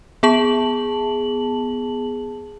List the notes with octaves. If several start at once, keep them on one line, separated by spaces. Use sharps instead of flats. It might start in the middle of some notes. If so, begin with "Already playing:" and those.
B3 G#4 A5 F#7